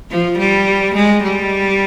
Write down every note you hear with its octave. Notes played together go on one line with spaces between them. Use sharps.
F3
G3
G#3
G3